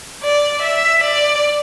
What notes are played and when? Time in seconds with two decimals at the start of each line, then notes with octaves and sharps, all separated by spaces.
0.23 D5
0.62 E5
1.03 D5